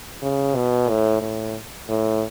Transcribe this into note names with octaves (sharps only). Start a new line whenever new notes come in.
C#3
B2
A2
A2
A2